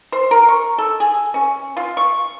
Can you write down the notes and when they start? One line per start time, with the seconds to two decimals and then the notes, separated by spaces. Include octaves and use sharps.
0.12 C5
0.31 A#4
0.48 C#6
0.78 A4
1.00 G#4
1.34 C#4
1.77 F4
1.97 C#6